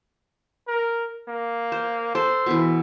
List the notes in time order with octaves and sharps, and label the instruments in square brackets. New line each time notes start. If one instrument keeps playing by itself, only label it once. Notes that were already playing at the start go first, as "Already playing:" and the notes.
[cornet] A#4
A#3
[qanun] C5
[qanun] A4 [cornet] C5
[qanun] B2 E3